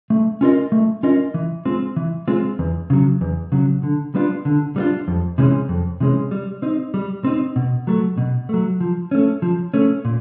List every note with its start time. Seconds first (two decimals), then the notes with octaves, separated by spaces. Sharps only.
0.10 A3
0.41 C#4 F4 A#4 D#5
0.72 A3
1.03 C#4 F4 A#4 D#5
1.34 E3
1.65 G#3 C4 F4
1.96 E3
2.28 G#3 C4 F4
2.59 E2
2.90 C#3 F#3
3.21 E2
3.52 C#3 F#3
3.83 D3
4.15 G3 B3 D4 F4
4.45 D3
4.76 G3 B3 D4 F4
5.08 F2
5.38 C3 E3 G#3 C#4
5.69 F2
6.00 C3 E3 G#3 C#4
6.31 G3
6.62 C4 D#4
6.94 G3
7.24 C4 D#4
7.56 B2
7.87 F#3 A3
8.18 B2
8.49 F#3 A3
8.81 F3
9.11 A3 C#4
9.42 F3
9.74 A3 C#4
10.05 A#2